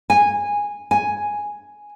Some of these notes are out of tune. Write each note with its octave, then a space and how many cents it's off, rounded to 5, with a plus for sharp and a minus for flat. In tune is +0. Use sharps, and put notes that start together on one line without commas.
G#5 -15
G#5 +0